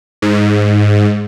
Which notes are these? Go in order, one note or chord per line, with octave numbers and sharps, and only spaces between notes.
G#2